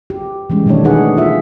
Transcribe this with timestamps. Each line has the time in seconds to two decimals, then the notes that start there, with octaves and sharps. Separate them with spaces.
0.10 G4
0.50 E3 G3 G#3 C#4
0.66 B2 D#3 G3 A3 D4 C#5
0.84 D#3 A3 D#4 G#4 B4 F#5
1.17 D4 F4 E5